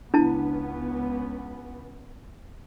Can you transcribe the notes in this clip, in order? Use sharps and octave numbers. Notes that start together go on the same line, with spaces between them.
C#2 C#3 B3 D4 E4 A5